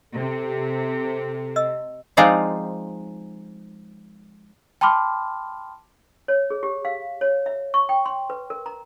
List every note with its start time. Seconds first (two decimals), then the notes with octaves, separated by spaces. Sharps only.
0.13 C3 A4
1.56 D#5 E6
2.17 F3 G#3 C4 D#4 D5 F5
4.81 G5 A5 B5 C6 D6 F6
6.28 C#5
6.50 G#4
6.63 G4
6.85 F5
7.21 C#5
7.46 E5
7.74 C#6
7.89 G5
8.06 C6
8.30 B4
8.50 A#4
8.66 A#5